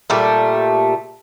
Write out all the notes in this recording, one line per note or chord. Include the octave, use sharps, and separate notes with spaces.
A#2 G3 A3